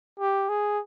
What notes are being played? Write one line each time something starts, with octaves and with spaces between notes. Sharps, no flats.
G4
G#4